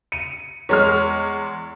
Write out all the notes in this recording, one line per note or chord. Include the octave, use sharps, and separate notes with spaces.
C#7 D#7
E2 G#3 C#5 F6